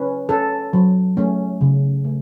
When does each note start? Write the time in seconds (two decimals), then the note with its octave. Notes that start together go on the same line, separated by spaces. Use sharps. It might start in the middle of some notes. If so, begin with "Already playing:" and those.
Already playing: C#4 B4
0.29 C#4 A4
0.73 F#3
1.17 A3 C#4
1.61 C#3
2.04 A3